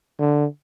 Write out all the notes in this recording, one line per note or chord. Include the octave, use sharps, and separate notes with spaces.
D3